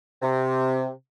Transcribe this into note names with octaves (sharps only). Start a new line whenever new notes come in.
C3